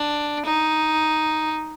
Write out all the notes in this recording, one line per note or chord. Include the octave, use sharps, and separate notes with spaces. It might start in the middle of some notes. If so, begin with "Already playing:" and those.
Already playing: D4
D#4